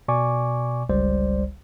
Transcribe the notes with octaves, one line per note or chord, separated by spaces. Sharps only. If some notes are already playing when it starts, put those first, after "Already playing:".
B2 D5 G#5 C#6 D6
G1 C#2 G3 C5 D5